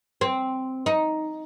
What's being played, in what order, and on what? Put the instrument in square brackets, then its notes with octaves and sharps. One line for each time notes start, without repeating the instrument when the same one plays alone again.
[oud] C4
D#4